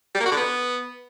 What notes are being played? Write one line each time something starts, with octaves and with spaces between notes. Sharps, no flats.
G3
A#3
F#4
D3
B3